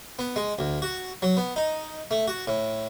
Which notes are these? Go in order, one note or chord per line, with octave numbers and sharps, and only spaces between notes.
B3
G#3
D2
F#4
F#3
B3
D#4
A3
F#4
A2